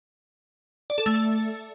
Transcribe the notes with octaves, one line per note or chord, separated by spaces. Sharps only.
D5
A4
A3